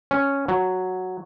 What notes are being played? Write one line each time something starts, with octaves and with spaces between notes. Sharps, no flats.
C#4
F#3